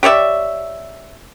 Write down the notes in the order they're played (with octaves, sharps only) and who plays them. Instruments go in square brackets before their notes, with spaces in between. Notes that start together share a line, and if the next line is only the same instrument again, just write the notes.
[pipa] G4 C#5 D5 E5